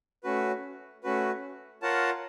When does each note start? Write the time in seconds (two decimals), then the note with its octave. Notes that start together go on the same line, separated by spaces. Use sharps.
0.24 A3 C#4 F#4 B4
1.04 A3 C#4 F#4 B4
1.82 F4 A#4 C#5 F#5 A5